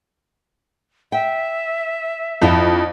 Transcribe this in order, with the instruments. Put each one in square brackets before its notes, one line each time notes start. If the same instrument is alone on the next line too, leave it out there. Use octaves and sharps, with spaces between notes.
[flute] E5 [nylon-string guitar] G5
[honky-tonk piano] F2 [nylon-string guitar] D4 E4 F4